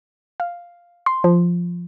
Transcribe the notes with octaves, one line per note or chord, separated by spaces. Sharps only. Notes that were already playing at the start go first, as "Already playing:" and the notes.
F5
C6
F3